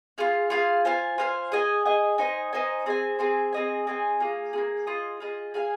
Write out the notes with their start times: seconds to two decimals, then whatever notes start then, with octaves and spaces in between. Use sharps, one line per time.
0.18 F4 G#4 F5
0.50 F4 G#4 F5
0.85 F4 C5 F5 G#5
1.18 F4 C5 F5 G#5
1.52 G#4 D#5 G#5
1.86 G#4 D#5 G#5
2.18 D#4 C5 D#5 G#5
2.53 D#4 C5 D#5 G#5
2.86 C4 G#4 C5 G#5
3.19 C4 G#4 C5 G#5
3.53 C4 G#4 D#5 G#5
3.87 C4 G#4 D#5 G#5
4.20 A#3 F4 G#4
4.53 A#3 F4 G#4
4.87 F4 G#4 D#5
5.20 F4 G#4 D#5
5.54 G#4 F5 G#5